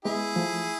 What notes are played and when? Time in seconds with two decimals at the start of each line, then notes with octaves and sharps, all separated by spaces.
0.05 G#3 B3 E4 G#4
0.36 F3 A3